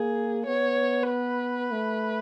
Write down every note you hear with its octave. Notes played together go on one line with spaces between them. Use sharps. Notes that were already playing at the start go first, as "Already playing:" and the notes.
Already playing: A#3 G#4
B3 C#5
B4
A3